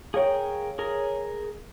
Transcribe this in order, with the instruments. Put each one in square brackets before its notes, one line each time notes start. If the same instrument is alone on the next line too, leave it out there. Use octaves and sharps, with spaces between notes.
[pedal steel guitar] G#4 A#4 G5 [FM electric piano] C#5 F5
[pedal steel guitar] G#4 A#4